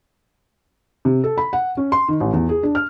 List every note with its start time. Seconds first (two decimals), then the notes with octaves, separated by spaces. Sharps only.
1.05 C3
1.24 A4
1.38 B5
1.53 F#5
1.77 C#4
1.92 C6
2.08 D#3
2.20 A1
2.33 E2
2.49 G#4
2.63 D4
2.75 F6